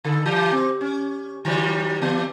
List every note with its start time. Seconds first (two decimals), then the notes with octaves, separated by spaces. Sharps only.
0.04 D3 A4
0.26 E3 G4
0.52 C4
0.81 C#4
1.45 D#3 F#3 G3
2.01 E3 B3